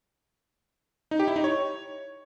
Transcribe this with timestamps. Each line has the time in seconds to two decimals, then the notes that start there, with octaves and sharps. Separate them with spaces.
1.11 D#4
1.20 G4
1.28 E4
1.36 D#4
1.44 C#5